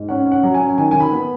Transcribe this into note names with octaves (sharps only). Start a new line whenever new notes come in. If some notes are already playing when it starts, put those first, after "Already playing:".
Already playing: G#2
C#4 F#5
C#4
F#5
F#3
G#5
C#4
D#3 G#5
D#3 G#5
B5
B3